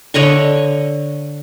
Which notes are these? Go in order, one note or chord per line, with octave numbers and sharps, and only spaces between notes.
D3 C#5 D#5 C#6